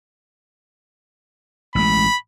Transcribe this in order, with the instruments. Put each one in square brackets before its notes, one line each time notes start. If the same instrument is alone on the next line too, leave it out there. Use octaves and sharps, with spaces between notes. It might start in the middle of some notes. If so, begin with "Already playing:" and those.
[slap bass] A1 G#3 [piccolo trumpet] B5